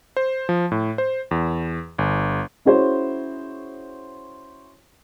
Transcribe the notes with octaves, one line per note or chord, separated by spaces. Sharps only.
C5
F3
A2
C5
E2
G1
C#4 E4 F#4 G#4 C5 C#5